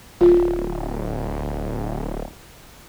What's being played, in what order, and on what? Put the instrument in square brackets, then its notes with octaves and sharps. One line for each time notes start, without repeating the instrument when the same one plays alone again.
[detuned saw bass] D1 [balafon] F4